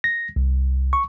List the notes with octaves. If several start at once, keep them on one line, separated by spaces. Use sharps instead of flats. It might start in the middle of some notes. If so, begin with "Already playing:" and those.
A#6
C2
C#6